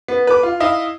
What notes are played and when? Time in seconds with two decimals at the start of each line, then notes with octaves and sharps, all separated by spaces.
0.08 B3
0.27 B4 D6
0.43 F4
0.60 E4 D#5 F5